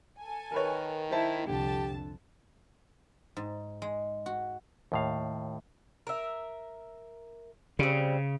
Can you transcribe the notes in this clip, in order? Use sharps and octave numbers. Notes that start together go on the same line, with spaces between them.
A4 G#5
D#3 A#4 B4 C#5
E4 C5 E5 A5
C2 F2 D3 G4 A5
G#2
G#3
F#4
D#2 A2 F5
A#4 E5
C#3 G3 C4